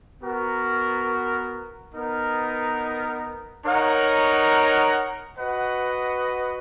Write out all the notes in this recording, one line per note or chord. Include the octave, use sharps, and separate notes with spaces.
B3 F#4 A#4
B3 D#4 A#4
D#4 A#4 C#5 F#5
F#4 B4 D#5 F#5